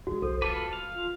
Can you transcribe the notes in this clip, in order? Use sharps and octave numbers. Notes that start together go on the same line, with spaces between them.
G#2 D#3 F#4 G#4
B1 A4 C5
D#1 F4 A4 B4 A5 D6
F5
F4